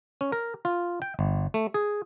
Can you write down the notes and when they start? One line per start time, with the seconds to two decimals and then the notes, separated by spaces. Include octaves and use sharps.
0.21 C#4
0.32 A#4
0.65 F4
1.02 G5
1.19 G1
1.54 A3
1.74 G#4